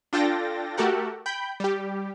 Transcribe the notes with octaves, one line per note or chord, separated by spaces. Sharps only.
D4 F4 A4 G5 A6 A#6
A3 F#4 G4 A4 A#4 F#5
G5 B5 G6
G3 G4